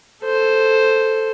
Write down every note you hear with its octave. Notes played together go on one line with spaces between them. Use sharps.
A4 C5